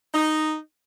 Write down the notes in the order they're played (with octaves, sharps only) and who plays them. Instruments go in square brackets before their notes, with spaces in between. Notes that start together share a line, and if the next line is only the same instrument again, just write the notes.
[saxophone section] D#4